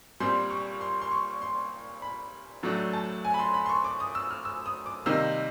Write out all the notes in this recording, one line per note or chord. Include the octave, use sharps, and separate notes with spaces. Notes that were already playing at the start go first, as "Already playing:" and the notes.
A#2 G3 C4 C6
C#6
C6
C6
C#6
C6
B5
A2 F#3 A3 D4
A5
G#5
B5
C6
B5
C6
C#6
D6
D#6
E6
F6
E6
D#6
D6
C3 D#3 G3 A#3 D#4 E6